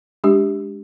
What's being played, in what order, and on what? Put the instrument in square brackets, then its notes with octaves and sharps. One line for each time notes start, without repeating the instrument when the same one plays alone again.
[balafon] G#3 D4 G4